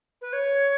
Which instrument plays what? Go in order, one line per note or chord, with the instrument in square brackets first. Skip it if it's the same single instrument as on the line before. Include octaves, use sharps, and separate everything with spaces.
[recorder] B4
C#5